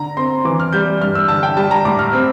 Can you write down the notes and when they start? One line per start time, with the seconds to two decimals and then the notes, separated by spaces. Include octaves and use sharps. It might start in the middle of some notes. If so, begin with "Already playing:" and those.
Already playing: D3 A#5
0.17 C4 C6
0.45 E3 D6
0.60 F6
0.73 G3 G6
1.01 G2 F6
1.15 E6
1.28 D3 A5
1.43 G5
1.57 G3 A5
1.71 A#5
1.85 A2 D6
1.99 F6
2.13 C4